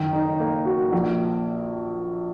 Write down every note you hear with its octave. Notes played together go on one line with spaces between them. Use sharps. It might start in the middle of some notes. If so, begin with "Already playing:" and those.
Already playing: F#1 D#3
D#4
A#3
F#4
A#1